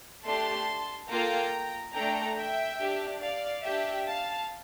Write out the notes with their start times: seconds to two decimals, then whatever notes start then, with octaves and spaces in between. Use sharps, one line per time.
0.24 A3 D4 G4 A5 C6
1.09 A#3 F4 A4 G5 A#5
1.94 A3 D4 A4 G5 A#5
2.36 E5 G5
2.79 D4 G4
3.21 D5 F5
3.63 D4 G4 E5 G5
4.06 F5 A5